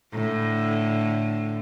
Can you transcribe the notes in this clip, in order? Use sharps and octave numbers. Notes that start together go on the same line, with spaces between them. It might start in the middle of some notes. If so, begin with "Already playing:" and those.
A2 D3